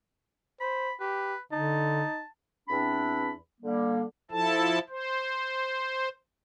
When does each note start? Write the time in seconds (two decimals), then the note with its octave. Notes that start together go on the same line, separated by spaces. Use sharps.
0.61 C5 B5
1.00 G4 B4
1.52 D3 D#4 A5
2.68 E2 C4 D4 B5
3.61 D3 G3 A#3
4.31 F3 E4 A4 A5
4.89 C5